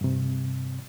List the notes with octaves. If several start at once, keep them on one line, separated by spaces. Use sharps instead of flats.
G2 C3